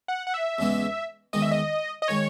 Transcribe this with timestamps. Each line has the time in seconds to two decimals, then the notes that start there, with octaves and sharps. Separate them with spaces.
0.08 F#5
0.27 F#5
0.34 E5
0.58 E2 C#3 G#3 B3
1.33 E2 D#3 G#3 D#5
1.42 E5
1.51 D#5
2.02 D#5
2.08 D#3 G#3 C#5